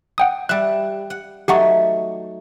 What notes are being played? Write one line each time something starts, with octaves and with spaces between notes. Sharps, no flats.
F#5 G5 D#6
G3 E5 F#6
F#5
F#3 A3 D#4 G4 F#5 C#6